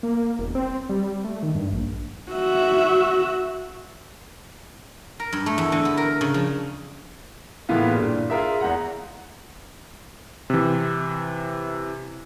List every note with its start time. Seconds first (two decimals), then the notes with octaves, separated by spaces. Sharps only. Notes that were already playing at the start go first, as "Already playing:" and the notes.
0.03 A#3
0.39 E1
0.55 C4
0.89 G3
1.24 A3
1.43 D#3
1.55 G2
1.73 A#1
2.31 F#4 E5
5.20 A#4
5.33 G2
5.46 A3
5.58 E2
5.72 D3
5.85 B3
5.97 A#4
6.21 C#3
6.34 F3
7.69 A2 E3 G#3 A#3 B3 F4
7.93 G2 A#2 D3
8.30 F4 G#4 A#4 E5
8.60 E2 G#3 F#5 A#5
10.50 C3 E3